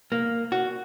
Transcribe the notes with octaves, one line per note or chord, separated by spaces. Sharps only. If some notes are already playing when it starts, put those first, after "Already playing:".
A#3
F#4